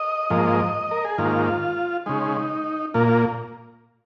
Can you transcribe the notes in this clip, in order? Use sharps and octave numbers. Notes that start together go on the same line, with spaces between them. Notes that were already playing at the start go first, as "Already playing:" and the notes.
Already playing: D#5
G#2 F3 A#3
A#4
G#4
G#2 D#3 A#3 F4
C#3 G#3 D#4
A#2 A#3 F4
F4